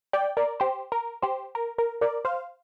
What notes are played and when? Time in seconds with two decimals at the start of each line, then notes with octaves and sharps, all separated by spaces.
0.13 D5 G5
0.37 A#4 D5
0.60 G4 C5
0.92 A#4
1.22 G4 C5
1.55 A#4
1.78 A#4
2.01 A#4 D5
2.25 C5 F5